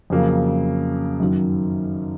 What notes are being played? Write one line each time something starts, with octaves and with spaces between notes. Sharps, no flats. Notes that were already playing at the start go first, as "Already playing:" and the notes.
F2 C#3 F#3 A#3
F#2 D#3 F#3